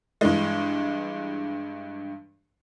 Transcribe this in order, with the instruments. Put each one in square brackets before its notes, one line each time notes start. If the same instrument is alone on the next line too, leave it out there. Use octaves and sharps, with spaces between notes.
[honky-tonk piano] G2 E3 G#3